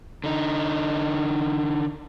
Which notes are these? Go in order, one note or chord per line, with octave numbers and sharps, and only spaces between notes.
D3 D#4